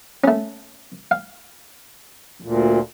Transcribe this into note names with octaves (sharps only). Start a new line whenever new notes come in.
A3 C#4
F5
D2 A#2